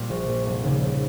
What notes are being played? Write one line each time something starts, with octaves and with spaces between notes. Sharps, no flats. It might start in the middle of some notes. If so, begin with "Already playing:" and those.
Already playing: A#2 G3
A#1
A#2 G3
F1
D#2 C#3 G3
F1